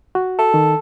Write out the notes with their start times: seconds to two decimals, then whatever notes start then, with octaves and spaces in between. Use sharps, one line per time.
0.15 F#4
0.39 A4
0.54 D#3